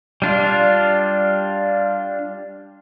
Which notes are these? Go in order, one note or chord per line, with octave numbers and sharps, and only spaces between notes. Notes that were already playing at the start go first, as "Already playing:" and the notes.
G3 D4 F4